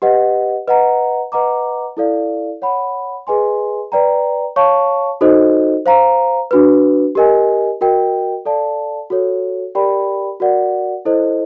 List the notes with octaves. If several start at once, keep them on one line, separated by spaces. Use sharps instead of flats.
G4 B4 D#5 F#5
B4 D#5 F#5 A#5
B4 D#5 F#5 A#5 D6
E4 A4 D5 F5
C#5 F#5 B5
G#4 B4 D#5 G#5 C6
B4 D5 G5 A#5
C#5 F5 A5 C#6
D#4 F#4 A4 C5 D#5
C5 F5 A#5
D4 F#4 B4
G4 A#4 D#5 G#5
F#4 A#4 D#5 G5
A4 D5 F5 A5
F#4 A4 C#5
G4 A#4 D5 G5 B5
F#4 A#4 D5 F#5
E4 A4 C5 D#5